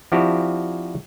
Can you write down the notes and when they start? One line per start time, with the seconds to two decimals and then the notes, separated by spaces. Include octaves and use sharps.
0.12 F3 C4 D4 E4 F#4 G4